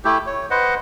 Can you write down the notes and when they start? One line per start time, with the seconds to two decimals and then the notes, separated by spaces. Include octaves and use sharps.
0.05 A3 E4 G4
0.27 C#5
0.50 B4 C5 D#5 F#5